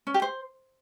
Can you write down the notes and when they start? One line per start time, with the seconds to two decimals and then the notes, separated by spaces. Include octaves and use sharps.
0.07 C#4
0.14 G4
0.22 C5